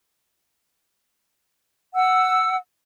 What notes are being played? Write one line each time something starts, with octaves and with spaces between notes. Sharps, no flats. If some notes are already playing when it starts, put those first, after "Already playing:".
F#5 E6